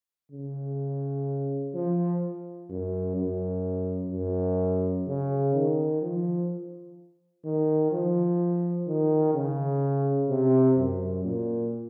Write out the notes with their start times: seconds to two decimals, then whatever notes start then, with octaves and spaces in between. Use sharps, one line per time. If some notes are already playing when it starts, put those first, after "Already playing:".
0.32 C#3
1.74 F3
2.70 F#2
3.16 F#2
4.11 F#2
5.07 C#3
5.54 D#3
6.02 F3
7.44 D#3
7.92 F3
8.87 D#3
9.34 C#3
10.29 C3
10.77 F#2
11.25 A#2